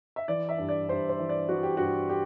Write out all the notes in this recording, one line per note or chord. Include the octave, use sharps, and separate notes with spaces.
E5
E3 D5
E5
G2
D5
G2 C5
C5
E3
D5
E3 F#4
G4
G2 F#4
G4